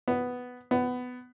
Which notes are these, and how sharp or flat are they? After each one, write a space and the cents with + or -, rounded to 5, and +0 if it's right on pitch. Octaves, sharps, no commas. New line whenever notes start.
B3 +5
B3 +15